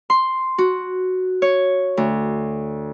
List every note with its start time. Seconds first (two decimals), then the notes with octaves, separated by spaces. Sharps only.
0.10 C6
0.58 F#4
1.42 C#5
1.97 D2